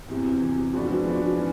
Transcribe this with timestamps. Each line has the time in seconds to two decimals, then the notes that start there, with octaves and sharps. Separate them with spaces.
0.08 E2 C3 E3
0.41 E2 C3 E3
0.73 F3 G#3 B3 D4 F#4
1.05 F3 G#3 B3 D4 F#4
1.37 E3 C#4